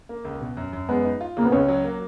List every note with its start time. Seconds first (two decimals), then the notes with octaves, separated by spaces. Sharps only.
0.09 A#3
0.25 C#2
0.41 B2
0.57 F#2
0.73 F#2
0.89 G#3 B3
1.05 D#4
1.21 F4
1.37 C#3 A#3
1.45 B3
1.52 C#2 C#4
1.68 F#3
1.84 A#3